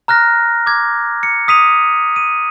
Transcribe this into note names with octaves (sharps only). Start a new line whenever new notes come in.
A#5 F6 F#6 A#6
D6 G#6
C#7
D#6 B6 D#7 F7
D#7